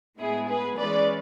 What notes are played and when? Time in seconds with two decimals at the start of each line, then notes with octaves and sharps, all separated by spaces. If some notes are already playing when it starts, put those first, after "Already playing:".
0.19 A2 G#3 B3 E4 G#4
0.48 G#4 B4
0.77 E3 G#3 C#4 B4 D5